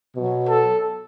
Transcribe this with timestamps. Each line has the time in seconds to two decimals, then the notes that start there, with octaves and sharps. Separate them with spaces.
0.14 B2 F#3
0.48 A4